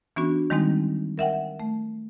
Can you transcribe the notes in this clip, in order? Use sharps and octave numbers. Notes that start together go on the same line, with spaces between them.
E3 B3 C#4 D4 F#4
D#3 G3 G#3 A#3 C4 D#4
A#4 E5 F#5 G5
A3